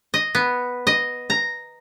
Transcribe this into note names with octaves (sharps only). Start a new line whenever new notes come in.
D#5
B3
D#5
A#5